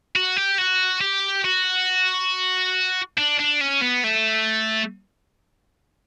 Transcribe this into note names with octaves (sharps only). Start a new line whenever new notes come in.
F#4
G4
F#4
G4
F#4
D4
D4
C#4
B3
A3